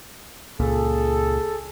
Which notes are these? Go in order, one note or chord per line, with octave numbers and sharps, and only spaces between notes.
C#2 A#2 G#4 A4